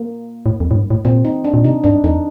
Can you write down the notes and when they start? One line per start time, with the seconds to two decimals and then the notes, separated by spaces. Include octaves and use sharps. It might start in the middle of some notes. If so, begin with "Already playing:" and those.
Already playing: A#3
0.46 A2
0.60 F2
0.71 A2
0.76 G2
0.90 A2
1.05 A#2 C4
1.25 D#4
1.44 D4
1.54 A#2
1.64 C3 D#4
1.84 G2 D4
2.04 F2 D#4